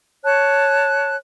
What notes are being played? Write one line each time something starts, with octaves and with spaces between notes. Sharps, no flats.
C#5 A5 F#6